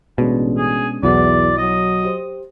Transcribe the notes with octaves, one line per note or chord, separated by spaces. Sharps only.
A1 B2 G#3 C#4 D4
G#4
B1 E2 E4 F#4 D5 F#5
F#3 D#5
G4 C5